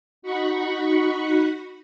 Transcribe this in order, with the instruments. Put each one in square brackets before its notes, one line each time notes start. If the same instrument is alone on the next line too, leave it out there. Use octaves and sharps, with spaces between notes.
[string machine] D#4 F#4 F#5 B5 C#6